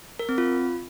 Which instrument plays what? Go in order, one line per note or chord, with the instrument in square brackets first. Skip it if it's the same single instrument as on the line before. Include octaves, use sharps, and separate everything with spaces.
[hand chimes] A#4
C4
F4